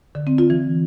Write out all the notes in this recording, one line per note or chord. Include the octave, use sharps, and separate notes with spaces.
D3
C4
F4
E3